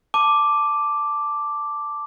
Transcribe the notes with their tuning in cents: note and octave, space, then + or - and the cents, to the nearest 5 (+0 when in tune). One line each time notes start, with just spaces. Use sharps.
A5 +0 D6 +0